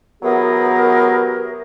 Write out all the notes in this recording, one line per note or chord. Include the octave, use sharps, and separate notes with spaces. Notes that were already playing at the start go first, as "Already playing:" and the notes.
E3 F#3 B3 G4 G#4 A#4